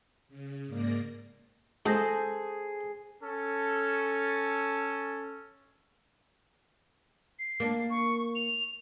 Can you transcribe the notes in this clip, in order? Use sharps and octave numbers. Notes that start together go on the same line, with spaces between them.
C#3
G#2 A#3 D5 A#6
G#3 G#4 A4 C5 A5 G6 A#6
C#4 A4
C7
A#3 D4
C#6
F7